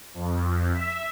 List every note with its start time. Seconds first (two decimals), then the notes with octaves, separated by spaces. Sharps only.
0.14 F2
0.72 E5